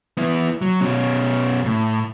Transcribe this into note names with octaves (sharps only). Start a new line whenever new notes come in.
B3 E4
F#3
B2 C#4
A2